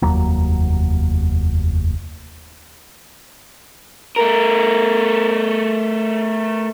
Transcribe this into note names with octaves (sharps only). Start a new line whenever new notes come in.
F1 D#2 F#3 A#3
A3 A#4